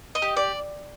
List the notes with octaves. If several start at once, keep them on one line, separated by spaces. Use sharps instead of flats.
D#5
G4
D5